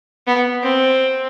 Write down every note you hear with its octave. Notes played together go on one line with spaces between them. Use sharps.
B3
C4